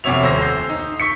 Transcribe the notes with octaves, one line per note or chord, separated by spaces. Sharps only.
F1 C3 F#4 C#5 E5 F7
D#1 C5 E6 A#6
G6 C7
D#4
C#6 B6 C#7